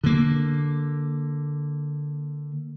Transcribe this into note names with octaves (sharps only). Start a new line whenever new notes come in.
D3 A#3